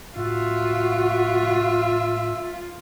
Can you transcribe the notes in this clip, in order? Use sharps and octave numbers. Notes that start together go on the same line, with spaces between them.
A2 F4 F#4 E5